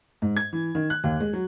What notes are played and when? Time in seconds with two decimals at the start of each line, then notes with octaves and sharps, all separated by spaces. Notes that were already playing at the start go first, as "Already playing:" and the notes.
0.22 G#2
0.37 G#6
0.53 E3
0.75 D#3
0.90 F#6
1.04 D#2
1.20 G#3
1.33 F#3